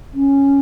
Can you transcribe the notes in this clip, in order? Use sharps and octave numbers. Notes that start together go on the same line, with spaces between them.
C#4